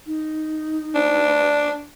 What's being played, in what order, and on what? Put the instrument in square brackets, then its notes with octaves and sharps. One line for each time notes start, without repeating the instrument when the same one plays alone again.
[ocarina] D#4
[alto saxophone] D4